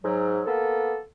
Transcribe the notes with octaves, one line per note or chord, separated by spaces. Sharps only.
G#2 F#3
A#3 B3 A4